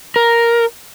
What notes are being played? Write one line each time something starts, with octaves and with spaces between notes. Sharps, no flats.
A#4